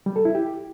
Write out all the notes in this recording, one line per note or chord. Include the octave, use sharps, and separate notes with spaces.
G3
A4
E4
G4